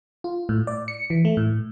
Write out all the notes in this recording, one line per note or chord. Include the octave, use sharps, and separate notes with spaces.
F4
A2
D5
C#7
E3
A3
A2